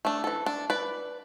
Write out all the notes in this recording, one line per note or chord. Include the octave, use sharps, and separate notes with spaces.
A3 D4
E3 A4
D4
B4 D5